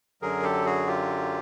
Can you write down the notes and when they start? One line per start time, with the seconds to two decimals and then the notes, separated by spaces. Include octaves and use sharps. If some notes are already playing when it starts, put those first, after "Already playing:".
0.22 F#2 D3 F#3 G#4 A#4
0.43 G4 A4
0.66 F#4 G#4
0.87 F4 G4